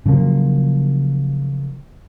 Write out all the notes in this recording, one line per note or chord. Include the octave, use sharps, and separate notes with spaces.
C#3 F3 F#3 A#3